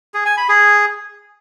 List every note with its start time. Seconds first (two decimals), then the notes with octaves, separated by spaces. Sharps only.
0.14 G#4
0.26 G#5
0.37 B5
0.49 G#4